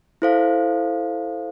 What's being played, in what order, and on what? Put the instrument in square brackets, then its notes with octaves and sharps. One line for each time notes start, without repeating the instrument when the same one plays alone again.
[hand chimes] E4 A4 C5 F5